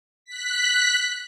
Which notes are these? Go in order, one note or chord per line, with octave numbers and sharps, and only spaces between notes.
F#6 B6